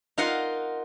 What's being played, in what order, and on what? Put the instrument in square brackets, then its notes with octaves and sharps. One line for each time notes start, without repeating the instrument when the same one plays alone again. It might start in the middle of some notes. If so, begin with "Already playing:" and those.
[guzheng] D#4 F4 A#4 F5 F#5